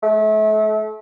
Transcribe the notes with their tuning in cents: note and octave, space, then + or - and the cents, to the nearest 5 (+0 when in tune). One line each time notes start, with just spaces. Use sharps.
A3 -35